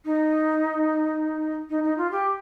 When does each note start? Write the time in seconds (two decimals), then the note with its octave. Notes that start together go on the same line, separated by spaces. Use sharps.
0.05 D#4
1.70 D#4
1.84 D#4
1.98 F4
2.12 G4